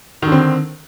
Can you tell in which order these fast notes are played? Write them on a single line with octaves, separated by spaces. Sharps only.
D#3 D3 C4